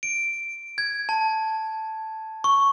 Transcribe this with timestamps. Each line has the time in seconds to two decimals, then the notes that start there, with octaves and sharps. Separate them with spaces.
0.03 D7
0.78 G#6
1.09 A5
2.44 C#6